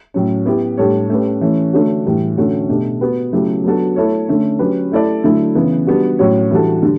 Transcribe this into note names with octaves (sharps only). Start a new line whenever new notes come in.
A2 F#3 C#4
B3 E4 G4
A2 G3 D4 A4 C#5
A3 C#4 G4 B4
E3 A3 C#4
D3 A3 D4 F#4 C#5
A2 E3 G3
D3 A3 C#4 F#4
B2 A3 D4 G4
B3 F#4 B4
C#3 F#3 A3 E4 G4
F#3 B3 D4 F#4 A4
A3 E4 A4 C#5
D3 A3 C#4
F#3 C#4 G4 B4
A3 E4 A4 D5
D3 F#3 A3 E4
C#3 E3 B3
G3 B3 D4 F#4
A2 F#3 C#4 F#4 C#5
E3 G3 D4 F#4 A4
D3 G3